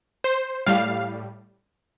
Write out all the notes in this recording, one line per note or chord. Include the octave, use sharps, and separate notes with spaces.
C5
A2 G3 F5